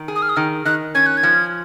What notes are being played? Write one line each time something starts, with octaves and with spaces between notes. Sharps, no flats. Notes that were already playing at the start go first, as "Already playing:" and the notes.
Already playing: D#3
G#4
D#6
F6
D#6
D#3 F6
D#3 F#6
C#4 G#6
F#6
G#6
F3